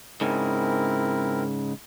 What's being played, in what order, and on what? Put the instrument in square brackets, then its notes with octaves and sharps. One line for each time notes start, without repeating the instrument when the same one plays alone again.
[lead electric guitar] G#2 C#3 [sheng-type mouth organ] C4 E4 A#4